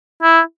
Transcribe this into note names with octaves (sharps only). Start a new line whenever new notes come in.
E4